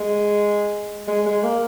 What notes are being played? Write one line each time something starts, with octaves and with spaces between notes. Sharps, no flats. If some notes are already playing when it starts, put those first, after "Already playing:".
Already playing: G#3
G#3
G#3
A#3